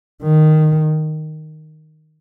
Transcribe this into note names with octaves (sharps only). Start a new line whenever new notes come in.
D#3